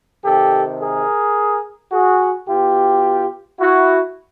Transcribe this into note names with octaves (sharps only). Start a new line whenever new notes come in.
C3 D#3 G4 A4
G#4 A#4
F#4 G#4
B2 F4 G4
E4 F#4